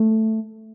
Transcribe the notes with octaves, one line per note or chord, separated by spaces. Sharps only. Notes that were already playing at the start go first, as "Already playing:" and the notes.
Already playing: A3